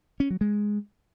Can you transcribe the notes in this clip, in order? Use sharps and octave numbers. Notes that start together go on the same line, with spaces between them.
C#4
F#3
G#3